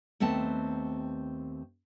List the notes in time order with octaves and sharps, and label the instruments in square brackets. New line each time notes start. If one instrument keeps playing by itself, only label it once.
[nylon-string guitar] D#2 A3 B3 C4 A5